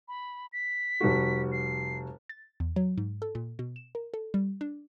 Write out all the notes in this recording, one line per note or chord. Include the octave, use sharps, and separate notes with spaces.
B5
B6
F1 G3 F#4
C7
A6
E2
F#3
G#2
A4
A#2
B2
E7
A#4
A4
G3
D4